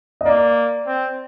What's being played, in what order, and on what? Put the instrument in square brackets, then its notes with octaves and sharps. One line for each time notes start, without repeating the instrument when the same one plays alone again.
[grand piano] D#5
[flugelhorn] A#3 [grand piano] D5
[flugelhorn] C4